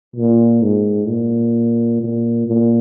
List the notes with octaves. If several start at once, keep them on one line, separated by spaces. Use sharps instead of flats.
A#2
G#2
A#2
A#2
A#2